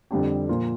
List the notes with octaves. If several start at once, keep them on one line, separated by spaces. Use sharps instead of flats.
F2 D3 G3 D4 G4
A#2 F3 A#3 F4